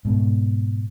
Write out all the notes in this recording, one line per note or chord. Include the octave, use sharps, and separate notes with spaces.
G#2 B2